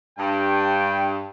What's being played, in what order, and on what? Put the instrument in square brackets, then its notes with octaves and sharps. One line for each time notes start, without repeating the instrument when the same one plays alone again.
[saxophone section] G2 [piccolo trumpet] G5